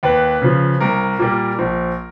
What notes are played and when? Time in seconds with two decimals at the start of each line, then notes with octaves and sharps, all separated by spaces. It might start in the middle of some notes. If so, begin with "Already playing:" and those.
0.03 D#2 B4
0.42 C#3 F3
0.80 C2 A#4
1.19 A#2 G3 A#3
1.59 A#1